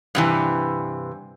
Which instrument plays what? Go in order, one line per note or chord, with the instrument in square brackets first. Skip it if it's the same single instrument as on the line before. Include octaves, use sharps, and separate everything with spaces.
[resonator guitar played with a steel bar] G2 C3 E3